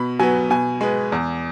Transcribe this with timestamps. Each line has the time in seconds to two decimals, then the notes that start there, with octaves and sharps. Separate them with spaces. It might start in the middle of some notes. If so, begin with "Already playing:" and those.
Already playing: B2 B5
0.19 F#3 B3 G#5
0.50 B2 G#5
0.81 G#3 B3
1.12 E2